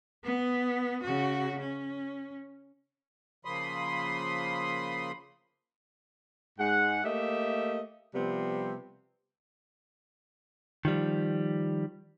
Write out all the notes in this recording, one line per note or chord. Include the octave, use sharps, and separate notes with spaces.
B3
C#3 F#4
C#4
C#3 F3 A#3 B5 C6 D#6
G#2 G#3 G#4 F#5
A3 A#3 G4 D#5 E5
C3 F3 G3 B3 C4
D#3 F3 G3